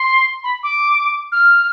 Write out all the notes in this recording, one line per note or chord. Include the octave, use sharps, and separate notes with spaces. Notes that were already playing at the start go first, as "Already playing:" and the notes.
Already playing: C6
B5
D6
F6